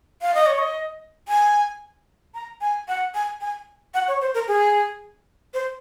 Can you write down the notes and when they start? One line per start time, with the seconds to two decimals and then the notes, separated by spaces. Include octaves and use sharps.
0.22 F5
0.34 D#5
0.47 C#5
0.58 D#5
1.28 G#5
2.34 A#5
2.61 G#5
2.88 F#5
3.14 G#5
3.41 G#5
3.94 F#5
4.08 C#5
4.21 C5
4.34 A#4
4.48 G#4
5.54 C5